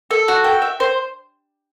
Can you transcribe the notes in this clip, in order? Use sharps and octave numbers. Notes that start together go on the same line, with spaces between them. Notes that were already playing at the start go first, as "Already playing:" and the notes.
A4
F#4
G5
E5
C5